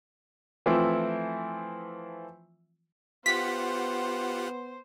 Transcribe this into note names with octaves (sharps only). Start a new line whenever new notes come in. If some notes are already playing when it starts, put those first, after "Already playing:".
E3 F3 A3 C4 E4 E5
B3 F4 G4 C5 F#5 B6